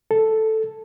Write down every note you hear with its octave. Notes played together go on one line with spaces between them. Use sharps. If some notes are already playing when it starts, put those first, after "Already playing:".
A4